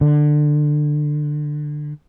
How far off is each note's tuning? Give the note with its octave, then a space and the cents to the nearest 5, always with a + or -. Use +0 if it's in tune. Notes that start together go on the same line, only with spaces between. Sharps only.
D3 +20